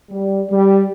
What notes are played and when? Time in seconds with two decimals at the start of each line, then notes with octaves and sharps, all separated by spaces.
0.10 G3
0.50 G3